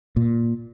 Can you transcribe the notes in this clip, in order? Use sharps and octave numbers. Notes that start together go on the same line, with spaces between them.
A#2